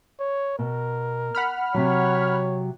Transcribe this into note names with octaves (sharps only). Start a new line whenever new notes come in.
C#5
B2 A#4
F#5 B5 F6
C3 F#3 C#5